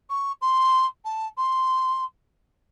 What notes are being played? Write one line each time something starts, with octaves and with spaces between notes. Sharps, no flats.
C#6
C6
A5
C6